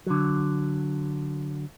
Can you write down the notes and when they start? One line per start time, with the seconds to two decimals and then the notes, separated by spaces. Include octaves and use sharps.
0.06 D3 F#3